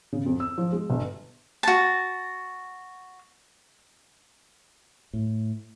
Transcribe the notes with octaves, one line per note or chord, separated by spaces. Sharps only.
C#3
F2
E6
F3
G#3
G1
F#4 A5
A2